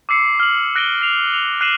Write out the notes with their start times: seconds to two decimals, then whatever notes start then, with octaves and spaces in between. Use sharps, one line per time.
0.09 D6 E6 C7 C#7
0.40 F6 F#7
0.76 F#6 A#6 D7 D#7 G7
1.02 C7 F7
1.34 F7
1.61 F#6 C7 D#7 E7 F#7